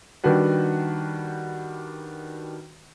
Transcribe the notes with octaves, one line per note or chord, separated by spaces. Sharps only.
D#3 G3 D4 F#4 B4